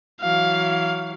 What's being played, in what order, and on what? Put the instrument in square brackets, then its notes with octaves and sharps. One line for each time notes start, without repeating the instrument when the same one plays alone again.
[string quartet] E3 F#3 [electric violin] F5